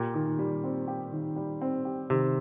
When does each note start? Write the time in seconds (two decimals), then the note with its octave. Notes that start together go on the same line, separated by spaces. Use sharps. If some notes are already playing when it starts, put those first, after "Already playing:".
Already playing: A#2 G4
0.14 D#3
0.39 G3
0.64 C4
0.88 G4
1.12 D#3
1.36 G3
1.61 C4
1.85 G4
2.10 C3 D#3